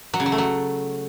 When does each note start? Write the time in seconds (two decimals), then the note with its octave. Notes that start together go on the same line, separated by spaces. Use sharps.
0.14 F#3
0.20 C#3
0.26 F#3
0.32 A3
0.38 F#3